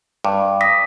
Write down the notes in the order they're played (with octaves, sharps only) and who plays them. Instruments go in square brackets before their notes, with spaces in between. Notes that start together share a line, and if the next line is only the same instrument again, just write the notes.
[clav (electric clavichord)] G2 [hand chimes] D6
[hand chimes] D#6 A#6 B6